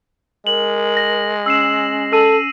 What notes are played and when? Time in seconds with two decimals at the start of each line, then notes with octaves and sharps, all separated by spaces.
0.47 G#3 A#4 F#7
0.97 A#6
1.46 C#4 E6 C7 E7
2.13 A4 E6 D#7